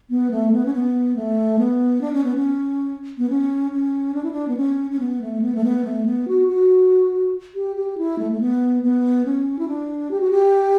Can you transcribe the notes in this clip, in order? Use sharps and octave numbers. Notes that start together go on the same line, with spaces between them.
B3
A3
B3
C#4
B3
A3
B3
D4
C#4
B3
C#4
B3
C#4
C#4
D4
E4
D4
B3
C#4
C#4
B3
A3
B3
A3
B3
A3
B3
F#4
F#4
G4
G4
E4
A3
A3
B3
B3
C#4
E4
D4
G4
F#4
G4